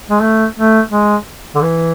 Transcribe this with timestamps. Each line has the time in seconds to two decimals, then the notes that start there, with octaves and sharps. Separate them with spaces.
0.10 G#3
0.21 A3
0.56 A3
0.92 G#3
1.55 D3
1.62 E3